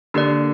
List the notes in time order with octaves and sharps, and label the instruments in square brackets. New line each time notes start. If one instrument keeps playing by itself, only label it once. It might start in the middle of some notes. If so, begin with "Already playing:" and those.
[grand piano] D3 [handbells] A#3 G4 A#4 D5